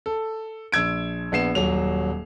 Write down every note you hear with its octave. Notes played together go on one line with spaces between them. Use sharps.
A4
A#1 E6 G#6 D7
A#1 B3 C7 E7
D#1 F#3 F7